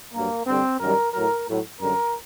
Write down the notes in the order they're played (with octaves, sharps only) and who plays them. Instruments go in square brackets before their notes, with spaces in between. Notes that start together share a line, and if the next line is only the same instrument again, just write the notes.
[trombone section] G2 F#3 A#3
G2 D3 G3 C4
F#2 D#3 G3 A#4
A2 F#3 A#4
A2 F#3
F#2 D3 G3 A#4